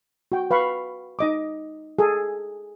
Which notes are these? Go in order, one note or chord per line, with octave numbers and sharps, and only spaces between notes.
F#4 G5
B4 F5 B5 C#6
D#4 D#5 D6
G#4 A4